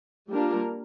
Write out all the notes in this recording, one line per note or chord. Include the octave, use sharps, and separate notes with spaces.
G3 A#3 D4 F4 A#4